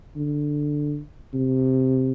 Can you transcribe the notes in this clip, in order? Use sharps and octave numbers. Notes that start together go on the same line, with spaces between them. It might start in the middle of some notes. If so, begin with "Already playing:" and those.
D3
C3